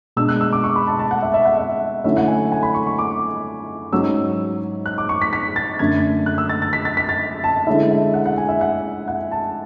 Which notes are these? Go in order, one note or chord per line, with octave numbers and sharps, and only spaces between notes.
B2 G#3 D4 E6
F#6
E6
D6
C#6
B5
A5
A5
F#5
E5
E5
F#5
E5
D3 F#3 A3 C#4 E4 E5
F#5
G#5
G#5
B5
C#6
C#6
D6
G#2 F#3 C#4 E6
F#6
D6
C#6
B6
B6
A6
F#2 D3 A3 D4 G#6
F#6
E6
A6
A6
B6
A6
B6
A6
A5
D3 G#3 C#4 E4 E5
E5
F#5
F#5
G#5
E5
F#5
F#5
A5